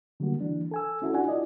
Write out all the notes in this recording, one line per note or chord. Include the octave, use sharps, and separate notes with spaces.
D3 F#3 G3 A#3 F#4
E3 D4
A4 G#5 E6
C#4 E4 F#4 A4
D4 F4 F#4 F#5 G#5
E4 F4 D5 D#5